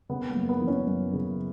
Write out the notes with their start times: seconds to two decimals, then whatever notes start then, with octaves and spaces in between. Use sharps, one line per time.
0.09 C#3 B3
0.29 A#3
0.36 F#2
0.49 B3
0.62 E3
0.67 C#4
0.87 F#2
1.13 C#3